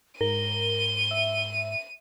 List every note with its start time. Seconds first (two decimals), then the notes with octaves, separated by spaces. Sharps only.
0.21 G#2 A#4 D#7 G7
1.11 E5